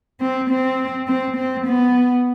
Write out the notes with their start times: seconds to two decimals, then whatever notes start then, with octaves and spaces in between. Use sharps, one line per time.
0.20 C4
0.50 C4
1.08 C4
1.37 C4
1.67 B3